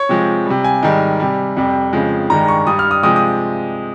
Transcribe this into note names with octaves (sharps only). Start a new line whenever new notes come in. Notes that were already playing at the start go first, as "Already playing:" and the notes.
Already playing: C#5
C3 F3 G#3
C3 G3
G#5
G#2 D#3 G3
C3 G3
F2 C3 G3
F2 C#3 F3 G#3
G2 D#3 G#3 A#5
C#6
G2 G3 D#6
F6
D#6
C3 F3 G#3 D#6
D#6